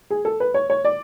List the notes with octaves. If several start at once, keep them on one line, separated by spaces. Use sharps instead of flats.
G#4
A4
B4
C#5
C#5
D5